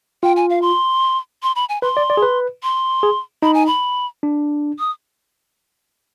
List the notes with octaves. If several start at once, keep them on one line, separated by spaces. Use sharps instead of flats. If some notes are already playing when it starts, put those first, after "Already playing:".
F4 G5
G#5
F5
C6
C6
B5
G#5
B4 C6
D5
D5
G#4
B4
C6
G#4
D#4 B5
G#5
B5
D4
D#6